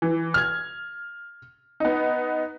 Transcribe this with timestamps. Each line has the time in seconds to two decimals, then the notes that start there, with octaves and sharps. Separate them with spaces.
0.02 E3
0.34 F6 G#6
1.80 B3 D#4